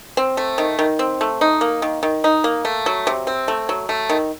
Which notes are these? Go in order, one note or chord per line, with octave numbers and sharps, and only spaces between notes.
C4
A3
D#3
D#3
C4
A3
D#4
A#3
D#3
D#3
D#4
A#3
A3
F#3
C3
C4
A3
F#3
A3
D#3